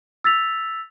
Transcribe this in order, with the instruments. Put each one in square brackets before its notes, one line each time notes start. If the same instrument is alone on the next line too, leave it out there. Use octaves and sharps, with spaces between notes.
[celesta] E6 A6 B6 F7